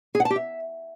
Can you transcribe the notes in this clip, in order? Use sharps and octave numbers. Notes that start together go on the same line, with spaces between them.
G#4
F#5
A5
G4
E5